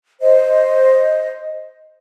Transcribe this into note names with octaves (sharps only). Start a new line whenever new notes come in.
C5 D#5